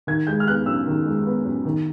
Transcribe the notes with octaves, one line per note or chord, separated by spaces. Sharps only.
D#3 G#6
G#3 G6
F6
B3 F#6
F#2 E6
D#3
G#3
B3
F#2
D#3